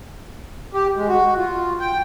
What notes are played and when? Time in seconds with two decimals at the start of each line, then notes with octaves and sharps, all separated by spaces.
0.74 G4
0.97 G#3
1.08 F#4
1.37 F4
1.80 G5